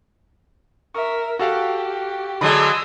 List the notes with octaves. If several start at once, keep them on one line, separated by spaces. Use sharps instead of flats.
A#4 E5 C#6
F#4 G4 A4 F5
D3 F#3 G#3 B5 D#6 E6